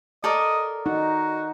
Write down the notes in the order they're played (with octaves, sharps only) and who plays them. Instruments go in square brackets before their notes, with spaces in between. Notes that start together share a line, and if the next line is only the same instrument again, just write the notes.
[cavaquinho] A4 A#4 D5 [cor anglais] D#5
[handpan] D#4 [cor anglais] F#4